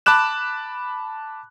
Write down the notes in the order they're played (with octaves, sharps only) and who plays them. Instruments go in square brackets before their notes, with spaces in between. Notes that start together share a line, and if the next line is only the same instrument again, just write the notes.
[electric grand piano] A5 B5 D6 F#6 E7